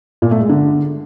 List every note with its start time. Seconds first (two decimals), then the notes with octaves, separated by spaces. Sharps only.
0.22 A#2
0.31 A3
0.40 G#3
0.49 D3